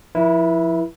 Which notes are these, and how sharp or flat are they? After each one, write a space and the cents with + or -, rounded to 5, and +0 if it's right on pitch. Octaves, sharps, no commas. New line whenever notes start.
F3 -5 E4 +0 B4 -40